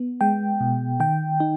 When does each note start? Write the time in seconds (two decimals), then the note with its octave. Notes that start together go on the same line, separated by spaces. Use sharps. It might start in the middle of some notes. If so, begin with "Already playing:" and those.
Already playing: B3
0.21 G#3 G5
0.60 B2
1.00 D#3 G5
1.40 D#4